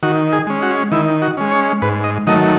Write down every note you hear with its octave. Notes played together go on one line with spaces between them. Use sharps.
D#3 F#4
G#4
G#3 C#4
F#4
D#3 E4
F#4
G#3 C#4
C#5
G#2 B4
D#5
D#3 F#3 A3 D#5